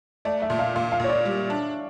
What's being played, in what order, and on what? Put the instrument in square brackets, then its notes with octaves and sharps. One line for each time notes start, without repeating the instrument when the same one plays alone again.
[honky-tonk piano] A3 [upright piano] D5
[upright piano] E5
[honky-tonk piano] A#2
[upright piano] F5
[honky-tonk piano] A#2 [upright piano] F5
[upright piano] F5
[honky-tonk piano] A#2 [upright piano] C#5
[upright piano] D5
[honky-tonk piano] G3
D4